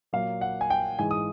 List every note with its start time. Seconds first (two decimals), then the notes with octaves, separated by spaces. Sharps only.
0.13 A#2 F#3 A#3 F5
0.41 F#5
0.61 G#5
0.70 G5
0.99 G#2 E3 G#3 G#5
1.11 D#6